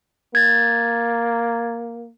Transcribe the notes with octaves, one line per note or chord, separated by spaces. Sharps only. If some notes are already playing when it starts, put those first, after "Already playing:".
A#3 G#6 A6